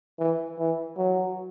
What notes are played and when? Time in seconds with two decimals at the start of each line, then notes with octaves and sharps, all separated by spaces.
0.19 E3
0.59 E3
0.97 F#3